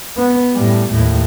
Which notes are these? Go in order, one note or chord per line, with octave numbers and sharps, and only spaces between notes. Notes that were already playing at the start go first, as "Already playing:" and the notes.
B3
A2 G3
D#2 A2